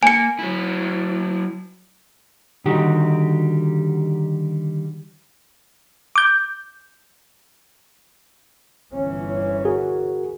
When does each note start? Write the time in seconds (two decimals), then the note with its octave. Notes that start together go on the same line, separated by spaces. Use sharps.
0.03 A#3 G#5 C#7
0.39 F#3 E4
2.66 D3 D#3 G3 F#4 G4
6.16 D6 G6
8.91 G1 E3 C#4
9.65 F#4 G#4 A#4